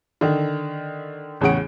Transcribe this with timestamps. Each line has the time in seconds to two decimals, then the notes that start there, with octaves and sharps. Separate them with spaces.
0.21 D3 D#3
1.41 A1 E2 C#3 C#5 F#5 D7